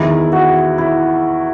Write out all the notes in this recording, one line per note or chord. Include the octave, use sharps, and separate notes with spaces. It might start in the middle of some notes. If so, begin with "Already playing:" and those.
Already playing: E2 D#3 E4
F#4
E4